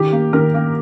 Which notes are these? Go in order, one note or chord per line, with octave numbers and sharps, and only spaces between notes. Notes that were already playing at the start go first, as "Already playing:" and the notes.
Already playing: D#3 G4
A#3
D#3 A#4
A#3